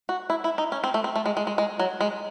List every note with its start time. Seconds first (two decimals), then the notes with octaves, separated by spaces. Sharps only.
0.09 F#4
0.30 E4
0.44 E4
0.58 D#4
0.72 C#4
0.84 C4
0.94 A3
1.04 C4
1.16 A3
1.26 G#3
1.37 G#3
1.47 G#3
1.58 G#3
1.79 F#3
2.01 G#3